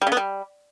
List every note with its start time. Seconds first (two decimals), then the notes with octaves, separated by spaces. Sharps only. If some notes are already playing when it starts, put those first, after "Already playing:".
0.02 G3
0.07 C#3
0.12 B3
0.17 G3